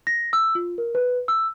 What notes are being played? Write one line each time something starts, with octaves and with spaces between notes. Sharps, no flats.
A#6
E6
F4
A#4
B4
E6